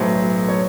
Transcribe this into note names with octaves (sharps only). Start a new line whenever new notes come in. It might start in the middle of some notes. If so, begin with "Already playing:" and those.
Already playing: B1 A2 F#3 B3 C5
C#5